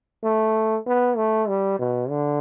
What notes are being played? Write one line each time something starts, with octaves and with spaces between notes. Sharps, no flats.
A3
B3
A3
G3
B2
D3